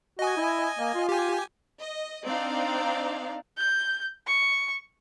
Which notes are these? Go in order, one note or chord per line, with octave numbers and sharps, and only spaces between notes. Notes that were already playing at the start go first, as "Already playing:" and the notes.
F#4 D#5 G#5
E4
A#3
F4
G4 G#5
D#5
C4 D4 D#4 D5 F5 A#5
G6
C#6